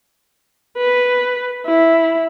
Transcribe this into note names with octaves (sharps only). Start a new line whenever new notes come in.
B4
E4